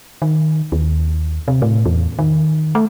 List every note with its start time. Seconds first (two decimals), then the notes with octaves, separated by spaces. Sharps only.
0.22 D#3
0.72 D#2
1.48 C3
1.62 A2
1.86 E2
2.19 D#3
2.75 A3